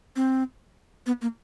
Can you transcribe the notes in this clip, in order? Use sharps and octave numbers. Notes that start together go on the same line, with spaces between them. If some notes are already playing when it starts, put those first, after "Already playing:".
C4
B3
A#3